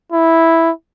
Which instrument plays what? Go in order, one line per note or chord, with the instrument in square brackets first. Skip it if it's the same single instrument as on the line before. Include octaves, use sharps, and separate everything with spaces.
[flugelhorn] E4